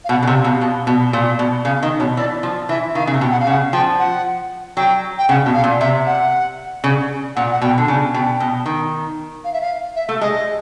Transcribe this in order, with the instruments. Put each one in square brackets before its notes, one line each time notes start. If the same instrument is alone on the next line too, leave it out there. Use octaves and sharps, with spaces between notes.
[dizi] F5
[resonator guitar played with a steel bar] B2 [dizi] F#5
[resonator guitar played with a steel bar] C#3
[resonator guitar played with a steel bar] C3 [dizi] F#5
[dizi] F5
[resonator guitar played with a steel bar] B2
B2
B2
A#2
B2
[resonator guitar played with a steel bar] C#3 [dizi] F5
[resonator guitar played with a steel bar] D#3 [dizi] D#5
[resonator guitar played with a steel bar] B2 [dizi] C#5
[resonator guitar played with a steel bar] E3 [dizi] D5
[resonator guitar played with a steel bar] F3
[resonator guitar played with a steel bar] E3 [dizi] E5
[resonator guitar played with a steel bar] D#3 [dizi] F5
[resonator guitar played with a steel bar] C#3
C3
[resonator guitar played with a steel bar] B2 [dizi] G5
[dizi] F#5
F5
[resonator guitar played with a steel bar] C#3 [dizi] F#5
[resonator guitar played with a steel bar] F3 [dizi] G5
[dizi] F#5
[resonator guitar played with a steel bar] F#3 [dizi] G5
[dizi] G5
[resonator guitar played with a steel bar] C#3 [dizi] F#5
[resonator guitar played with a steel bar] B2
[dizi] F5
[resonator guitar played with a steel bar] A#2
[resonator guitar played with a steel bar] C3 [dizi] E5
[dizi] F#5
[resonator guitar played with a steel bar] C#3
[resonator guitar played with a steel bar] A#2 [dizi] F#5
[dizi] F#5
[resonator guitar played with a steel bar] B2 [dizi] G5
[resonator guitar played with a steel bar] D3
[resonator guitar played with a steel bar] C#3 [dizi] G#5
[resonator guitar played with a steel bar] B2 [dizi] G5
[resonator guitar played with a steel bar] B2
D#3
[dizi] F5
E5
F5
E5
[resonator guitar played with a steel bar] A3
[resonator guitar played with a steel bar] G#3 [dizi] D#5